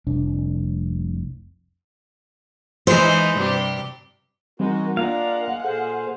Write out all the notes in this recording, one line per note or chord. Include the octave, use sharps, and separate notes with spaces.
F1 C2 D4
E3 G#3 D#4 C5
G2 C3 G4
E3 G3 G#3 A#3 C4 D#4 F#4
G#3 A#3 D4 F4 A#4 F5 F#5
A#2 G#4 A4 C5